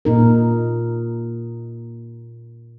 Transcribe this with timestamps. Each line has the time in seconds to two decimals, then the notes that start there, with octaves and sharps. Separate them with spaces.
0.05 A#2 D#4 A#4